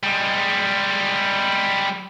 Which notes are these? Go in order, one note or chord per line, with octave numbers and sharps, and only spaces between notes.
G3 G#3